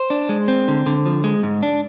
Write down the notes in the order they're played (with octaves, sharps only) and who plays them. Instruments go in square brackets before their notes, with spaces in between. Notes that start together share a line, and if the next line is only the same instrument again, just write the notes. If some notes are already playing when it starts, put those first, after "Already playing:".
Already playing: [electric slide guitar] C5
D4
G#3
C4
D3
D3
F3
G#3
G#2
D4